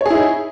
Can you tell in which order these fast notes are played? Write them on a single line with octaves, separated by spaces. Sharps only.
C#5 G#4 E4 D#4